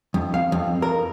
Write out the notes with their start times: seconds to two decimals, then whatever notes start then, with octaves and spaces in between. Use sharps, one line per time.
0.14 F2
0.34 F5
0.52 F2
0.82 A#4